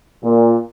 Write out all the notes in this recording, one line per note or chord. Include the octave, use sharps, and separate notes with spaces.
A#2